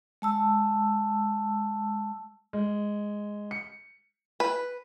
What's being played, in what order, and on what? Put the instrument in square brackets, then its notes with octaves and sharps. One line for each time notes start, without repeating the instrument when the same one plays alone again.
[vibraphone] G#3 A5 E6
[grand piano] G#3
C#7
[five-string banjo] B4